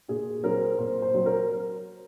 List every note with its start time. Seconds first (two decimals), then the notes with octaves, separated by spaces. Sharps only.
0.08 A#2 G#4
0.43 F#3 C4 A#4
0.79 A#2 C5
1.02 C5
1.14 F#3 C4
1.26 A#4